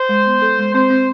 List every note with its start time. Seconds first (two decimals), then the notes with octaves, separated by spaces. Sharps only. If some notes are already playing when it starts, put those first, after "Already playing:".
Already playing: C5
0.09 G#3
0.26 B3
0.42 A4
0.59 G#3
0.74 C4 C5
0.90 C4